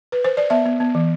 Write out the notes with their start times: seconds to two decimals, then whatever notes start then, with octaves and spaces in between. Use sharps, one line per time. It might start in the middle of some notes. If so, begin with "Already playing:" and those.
0.12 B4
0.24 C5
0.37 D5
0.50 B3 E5
0.65 B3
0.80 B3
0.95 E3